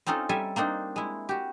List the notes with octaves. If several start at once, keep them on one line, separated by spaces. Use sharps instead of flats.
C4 C#4 D#4 F4 A4
G3 A4 E5 G#5 A5
A#3 C4 D4 D#4
G#3 E4
F#4 G4